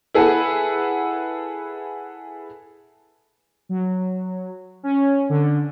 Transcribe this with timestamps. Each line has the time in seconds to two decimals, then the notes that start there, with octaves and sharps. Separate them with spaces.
0.14 E4 G#4 A4 B4 F#5
3.69 F#3
4.83 C#4
5.29 D3